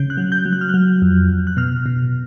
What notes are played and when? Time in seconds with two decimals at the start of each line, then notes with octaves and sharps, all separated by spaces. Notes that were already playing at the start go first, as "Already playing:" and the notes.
Already playing: C#3 G6
0.10 F#6
0.17 F#3
0.32 G6
0.46 F#3
0.53 F#6
0.61 F6
0.69 F#3 F#6
1.02 F2
1.29 F2
1.47 F#6
1.57 B2 F6
1.86 B2